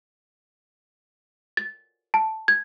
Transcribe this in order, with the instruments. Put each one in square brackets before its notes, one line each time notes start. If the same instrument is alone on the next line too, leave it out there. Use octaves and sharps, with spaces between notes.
[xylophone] A6
A5
G#6